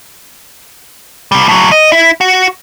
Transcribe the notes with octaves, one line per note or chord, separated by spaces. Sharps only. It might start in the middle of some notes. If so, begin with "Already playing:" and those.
C3 G3
A2 F#3
D#5
E4
F#4